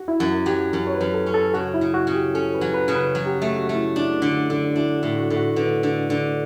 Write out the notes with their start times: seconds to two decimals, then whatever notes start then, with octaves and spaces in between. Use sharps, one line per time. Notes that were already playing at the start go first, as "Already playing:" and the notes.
Already playing: F#4
0.08 E4
0.20 F#2 F#4
0.46 F#3 G4
0.73 F#2
0.87 C#5
0.94 B4
1.01 F#2
1.14 A4
1.26 C#4
1.34 A4
1.54 C#3 F#4
1.74 E4
1.81 C#3
1.94 F#4
2.07 C#3
2.14 G4
2.34 C#4 A4
2.54 B4
2.61 F#3
2.74 B4
2.88 C#3
2.95 B4
3.15 F#3
3.26 G4
3.35 F#4
3.42 A3
3.55 F#4
3.69 A3
3.75 E4
3.96 D4 E4
4.22 D3
4.50 D3
4.71 F#4
4.76 D4 E4
4.96 F#4
5.03 A2
5.17 F#4
5.30 A2
5.37 F#4
5.56 D3 B4
5.83 D3
6.10 D3